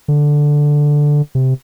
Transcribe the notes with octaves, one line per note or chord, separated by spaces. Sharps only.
D3
C3